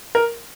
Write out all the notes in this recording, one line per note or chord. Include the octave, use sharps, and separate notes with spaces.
A#4